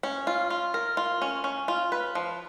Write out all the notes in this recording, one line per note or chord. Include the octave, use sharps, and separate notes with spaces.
C#4
F4
F4
A#4
F4
C#4
C#4
F4
B4
F3